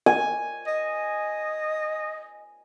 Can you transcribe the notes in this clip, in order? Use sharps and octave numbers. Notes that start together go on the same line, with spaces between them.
G#5
D#5